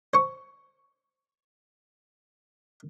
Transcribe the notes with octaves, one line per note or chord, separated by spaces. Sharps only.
C5 C#6